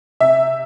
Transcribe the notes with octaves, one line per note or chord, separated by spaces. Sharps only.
C3 E5